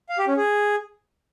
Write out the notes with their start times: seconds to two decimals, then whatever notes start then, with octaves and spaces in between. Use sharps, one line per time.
0.09 F5
0.18 G4
0.27 C#4
0.37 G#4